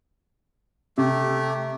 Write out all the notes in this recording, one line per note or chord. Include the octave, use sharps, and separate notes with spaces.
C3 A3 G4